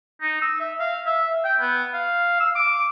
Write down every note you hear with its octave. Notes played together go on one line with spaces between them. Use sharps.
D#4
E6
E5
F5
E5
G5
B3
F5
E6
D6